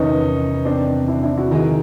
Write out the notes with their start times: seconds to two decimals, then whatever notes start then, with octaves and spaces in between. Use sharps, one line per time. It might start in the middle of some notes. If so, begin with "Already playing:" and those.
Already playing: E2 C3 D#3 C#4 D#4
0.65 C4 D4
1.08 D4 E4
1.22 D4 E4
1.37 E4 F#4
1.51 D#3 G#3 C4 D#4 F#4 G#4